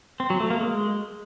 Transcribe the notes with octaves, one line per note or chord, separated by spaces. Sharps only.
C4
F#3
A3
A#3
G#3